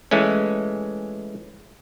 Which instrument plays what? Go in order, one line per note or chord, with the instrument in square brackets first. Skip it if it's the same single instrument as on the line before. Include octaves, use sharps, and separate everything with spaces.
[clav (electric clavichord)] E3 G#3 A3 C#4